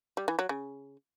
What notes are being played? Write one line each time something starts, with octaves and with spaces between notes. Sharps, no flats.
G3
E3
F#3
C#3